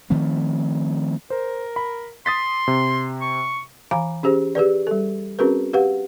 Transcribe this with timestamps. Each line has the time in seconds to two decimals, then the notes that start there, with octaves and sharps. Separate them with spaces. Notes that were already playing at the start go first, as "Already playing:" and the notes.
0.10 D#3 F3 A3 C4
1.30 A#4 C5
1.76 B5
2.26 C6 D#6 A6 B6
2.68 C3
3.21 C#6
3.91 E3 F5 G#5 A#5 B5 D6
4.23 C#4 G4 G#4 C5
4.55 G4 G#4 B4 D5
4.87 G3 A4
5.39 C4 C#4 F#4 G#4 A#4 B4
5.73 G4 B4 F5 F#5